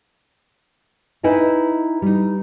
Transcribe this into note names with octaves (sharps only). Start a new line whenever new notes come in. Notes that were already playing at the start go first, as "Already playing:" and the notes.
D#4 E4 B4 D#5 G#5
G3 D#4